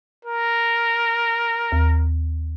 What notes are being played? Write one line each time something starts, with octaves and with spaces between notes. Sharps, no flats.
A#4
D#2